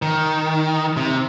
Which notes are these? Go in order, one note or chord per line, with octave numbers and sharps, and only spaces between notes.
D#3
C3